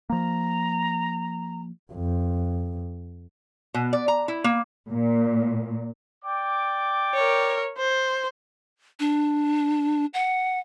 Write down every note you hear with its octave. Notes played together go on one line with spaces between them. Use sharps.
F3 A#3 A#5
F2
B2
D5
A#5
E4
A#3
A#2
D5 G5 D6
A#4 C#5
C5
D4
F#5